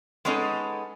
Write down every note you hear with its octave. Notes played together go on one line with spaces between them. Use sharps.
G#3 B3 C#4 D#4 G#4 A4